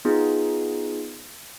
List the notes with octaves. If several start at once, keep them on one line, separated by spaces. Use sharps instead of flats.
B3 D#4 F4 G#4